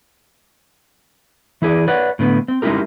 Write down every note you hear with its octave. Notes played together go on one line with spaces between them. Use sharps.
E3 E4 G#4 D5
B4 C#5 D5 F#5
A2 D3 B3
C4
G#3 C#4 D#4 E4 G4 A#4